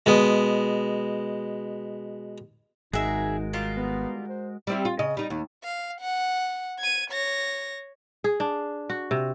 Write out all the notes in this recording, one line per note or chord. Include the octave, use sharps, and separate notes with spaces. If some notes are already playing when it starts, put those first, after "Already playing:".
B2 G#3
G#1 G#3 D#4 F#4 G#4 A#4 E5
D#3 G3 F4
B3
C5
G3 C4 E4
F4
C#3 D#5
G3 D#4
D#2
F5
F#5
G#6 D#7
C#5 A#6
G#4
D4
F#4
C3